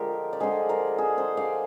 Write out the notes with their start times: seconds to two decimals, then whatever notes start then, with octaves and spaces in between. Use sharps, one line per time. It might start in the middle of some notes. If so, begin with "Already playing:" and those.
Already playing: D3 F3 G#3 F4 G4 A#4
0.33 D5
0.40 D3 G#3 G#4 C5
0.69 A#4 D5
0.98 G#4 C5
1.18 G#4 C5
1.37 D5 F5